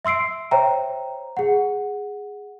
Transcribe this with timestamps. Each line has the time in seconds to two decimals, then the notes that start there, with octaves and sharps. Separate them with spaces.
0.05 E5 C6 E6 C7 D7
0.51 C5 C#5 E5 G5 A#5
1.37 G#4 F#5